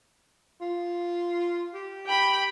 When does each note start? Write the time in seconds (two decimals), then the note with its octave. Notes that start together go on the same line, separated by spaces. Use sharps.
0.61 F4
1.74 G4
2.07 G5 B5